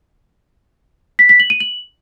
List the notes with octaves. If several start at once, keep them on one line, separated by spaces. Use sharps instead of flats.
B6
B6
F#7
D#7
F#7